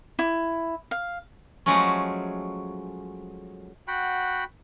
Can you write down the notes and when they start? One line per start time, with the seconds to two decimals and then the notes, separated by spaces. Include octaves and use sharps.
0.19 E4
0.91 F5
1.66 F3 F#3 G#3 A3 C#4
3.88 F#4 F#5 G5 B5